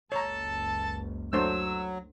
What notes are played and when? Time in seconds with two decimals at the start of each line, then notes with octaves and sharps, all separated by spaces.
0.12 F#1 C#2 A4 C#5 A5 A#5
1.33 F#3 A3 D4 C5 E6